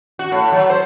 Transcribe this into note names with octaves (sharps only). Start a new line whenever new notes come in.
F#4
A2
F#3
C5